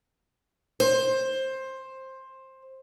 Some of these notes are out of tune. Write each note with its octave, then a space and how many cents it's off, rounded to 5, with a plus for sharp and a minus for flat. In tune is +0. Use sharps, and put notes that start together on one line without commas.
C5 +15